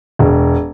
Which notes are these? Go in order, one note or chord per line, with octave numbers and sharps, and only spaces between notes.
E1